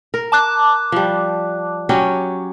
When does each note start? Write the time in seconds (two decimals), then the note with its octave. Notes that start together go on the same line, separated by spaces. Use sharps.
0.14 A#4
0.32 A5 D6 F#6
0.92 F3 G3
1.89 F#3 C#4 G4